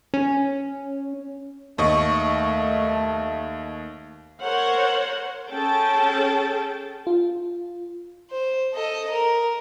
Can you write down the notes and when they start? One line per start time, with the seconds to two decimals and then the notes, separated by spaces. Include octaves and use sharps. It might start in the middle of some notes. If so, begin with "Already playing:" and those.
0.14 C#4
1.78 D#2 A3 D#5 C#6
4.42 A#4 C5 C#5 F#5
5.51 C#4 G#4 A4 G5 A5
7.07 F4
8.31 C5
8.73 A4 D#5
9.10 A#4